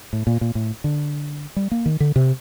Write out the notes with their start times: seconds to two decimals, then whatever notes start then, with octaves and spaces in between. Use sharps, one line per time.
0.13 A2
0.27 A#2
0.41 A#2
0.55 A2
0.84 D3
1.56 G3
1.71 A#3
1.86 D#3
2.00 D3
2.16 C3